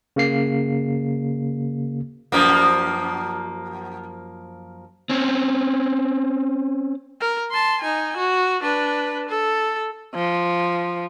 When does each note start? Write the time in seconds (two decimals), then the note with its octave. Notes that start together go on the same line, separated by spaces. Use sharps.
0.16 C#3 A#3 C7
2.32 F#2 F3 A#3
5.10 C4 C#4
7.20 A#4
7.51 A5 C6
7.81 D#4 G#5
8.17 F#4
8.61 D4 B4
9.28 A4
10.14 F3